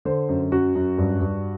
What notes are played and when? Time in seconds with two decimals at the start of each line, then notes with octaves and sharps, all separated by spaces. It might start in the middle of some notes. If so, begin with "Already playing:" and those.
0.05 D3 C5
0.29 F#2
0.52 F#2 F#4
0.75 F#2
0.98 G2
1.21 G2